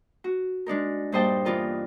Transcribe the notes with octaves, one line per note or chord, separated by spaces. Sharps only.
F#4
G#3 D4 D#4 A#4
G2 A#2 C5 D#5 G5 A5
E3 B3 D4 F4 A#4 D#5